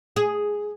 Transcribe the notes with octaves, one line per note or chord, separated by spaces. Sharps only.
G#4